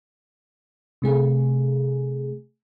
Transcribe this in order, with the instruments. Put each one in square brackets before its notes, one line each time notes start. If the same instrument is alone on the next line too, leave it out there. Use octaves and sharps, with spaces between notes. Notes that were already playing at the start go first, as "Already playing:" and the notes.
[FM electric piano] C3 A3 G#4